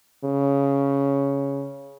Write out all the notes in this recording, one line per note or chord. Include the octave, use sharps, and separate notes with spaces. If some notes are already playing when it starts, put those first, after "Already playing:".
C#3